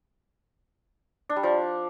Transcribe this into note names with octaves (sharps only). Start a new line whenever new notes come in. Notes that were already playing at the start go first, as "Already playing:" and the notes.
D4
G3
F3